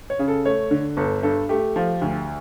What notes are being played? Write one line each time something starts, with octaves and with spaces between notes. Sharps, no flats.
C#5
C#3
A4
A3 C#5
D3
G1 A4
G2 A4
A3 G4
F3
D2